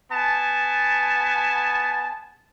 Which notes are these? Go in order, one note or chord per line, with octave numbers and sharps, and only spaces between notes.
B3 G#5 A5